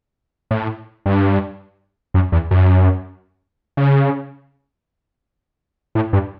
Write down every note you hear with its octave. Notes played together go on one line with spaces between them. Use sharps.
A2
G2
F#2
E2
F#2
C#3
A2
G2